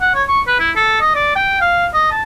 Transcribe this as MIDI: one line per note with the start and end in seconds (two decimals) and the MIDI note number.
0.01 0.10 78
0.15 0.23 73
0.28 0.41 85
0.47 0.57 71
0.60 0.71 64
0.76 1.00 69
1.01 1.14 75
1.15 1.34 74
1.36 1.56 79
1.61 1.86 77
1.94 2.09 75
2.11 2.23 81